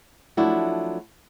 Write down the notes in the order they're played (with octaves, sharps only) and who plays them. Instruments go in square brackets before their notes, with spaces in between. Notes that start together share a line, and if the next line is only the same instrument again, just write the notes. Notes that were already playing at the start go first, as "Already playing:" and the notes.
[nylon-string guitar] F3 F#3 A3 D4 E4 F#4